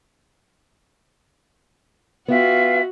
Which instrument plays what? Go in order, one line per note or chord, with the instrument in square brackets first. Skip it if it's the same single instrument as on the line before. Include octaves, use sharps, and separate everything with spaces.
[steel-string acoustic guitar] B3 G5 [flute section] F4 E5 [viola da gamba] F#4